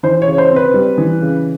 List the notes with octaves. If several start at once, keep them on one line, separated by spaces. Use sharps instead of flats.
E3 C5
C#3 C#5
C5
C4
B4
G3
E3
C#3